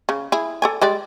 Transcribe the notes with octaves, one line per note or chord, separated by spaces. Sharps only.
C#3
E4 G#4
A4 D5 G#5
G3 G#3 D5